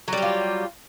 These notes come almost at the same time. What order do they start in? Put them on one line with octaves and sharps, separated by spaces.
F#3 G3 G4 F4